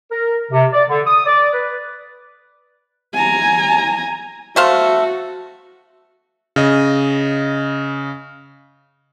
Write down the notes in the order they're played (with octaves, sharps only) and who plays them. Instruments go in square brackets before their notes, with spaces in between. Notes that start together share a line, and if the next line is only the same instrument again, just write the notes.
[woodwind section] A#4
C3
D5
D3
D#6
D5
B4
[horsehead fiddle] G#5 A#5
[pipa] A3 C5 F5 [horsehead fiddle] F#4
[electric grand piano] C#3 D#5